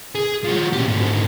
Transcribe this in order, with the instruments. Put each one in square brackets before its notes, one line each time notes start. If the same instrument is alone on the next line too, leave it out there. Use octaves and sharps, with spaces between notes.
[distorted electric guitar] G#4
F3 F#4
A#2 G4
G#2 D3